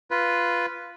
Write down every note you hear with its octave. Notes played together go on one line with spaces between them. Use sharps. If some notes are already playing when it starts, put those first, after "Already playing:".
F4 B4